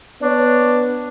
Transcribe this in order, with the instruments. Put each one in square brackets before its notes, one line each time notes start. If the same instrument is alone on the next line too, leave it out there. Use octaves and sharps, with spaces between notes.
[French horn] B3 [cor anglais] D4 [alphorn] C#5